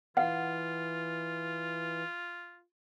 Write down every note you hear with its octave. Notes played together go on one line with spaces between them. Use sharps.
E3 F4 F5 F#5